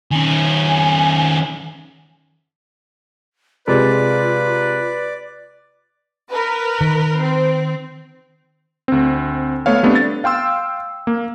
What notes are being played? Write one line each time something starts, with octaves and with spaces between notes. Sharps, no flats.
D#3 C#4 G#5
C3 G#3 F4 B4 D5
A#4 B4
D#3
C4
D2 C4
A3 B3 C#5 F5
G3 A3 B3 C4 D4
A6
F5 G5 C6 E6
A#3